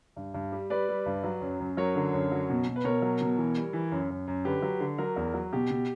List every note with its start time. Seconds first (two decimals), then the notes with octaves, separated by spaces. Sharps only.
0.16 G2
0.34 G2
0.52 G3
0.70 G3 B4 D5
0.89 G3
1.06 G2
1.24 F#3
1.41 F#2
1.60 F#2
1.77 F#3 A#4 C#5
1.95 D3
2.13 F#2
2.32 F#3
2.49 B2
2.67 B2
2.76 B4
2.84 B2 A#4 C#5
3.02 F#3
3.21 B2
3.38 E3
3.57 G3
3.73 E3
3.92 F#2
4.10 F#2
4.27 F#2
4.45 D3 G4 B4
4.62 F#3
4.80 D3
4.98 F#3 A#4
5.16 E2
5.34 F#3
5.53 B2 G4
5.70 B2